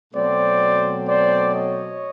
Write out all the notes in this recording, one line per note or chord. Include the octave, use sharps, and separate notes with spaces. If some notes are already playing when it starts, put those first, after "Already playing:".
B2 F#3 A3 C4 C5 D5
C5 D5
C#5 D#5